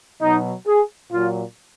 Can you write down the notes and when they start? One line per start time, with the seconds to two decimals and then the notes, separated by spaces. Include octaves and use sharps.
0.21 B2 F#3 D#4
0.67 G#4
1.12 A#2 F#3 F4